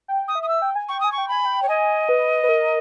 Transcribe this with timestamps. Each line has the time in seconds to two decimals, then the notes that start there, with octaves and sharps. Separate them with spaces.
0.08 G5
0.28 D#6
0.35 E5
0.43 D#6
0.48 E6
0.62 G5
0.75 G#5
0.89 G5 C#6
1.00 G#5 D#6
1.12 C#6
1.18 G5
1.28 G#5 B5
1.45 G5
1.63 C#5
1.69 D#5 G#5
2.09 B4
2.43 B4
2.49 A#4